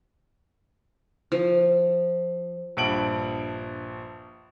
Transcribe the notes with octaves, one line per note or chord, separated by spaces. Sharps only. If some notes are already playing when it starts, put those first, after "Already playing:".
F3
A#1 G2 D7 F#7